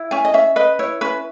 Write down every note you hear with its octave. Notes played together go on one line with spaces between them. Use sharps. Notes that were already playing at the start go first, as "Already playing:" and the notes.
Already playing: E4
C#4 G#5
D#5
C#4 E5
B4 D#5
E4 C#5
C#4 B4